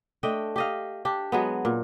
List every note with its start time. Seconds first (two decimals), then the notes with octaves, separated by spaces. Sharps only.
0.23 A3 D4 D#5 G5
0.56 G4 D#5 F5
1.05 D4 G4
1.32 F#3 G#3 B3
1.65 A#2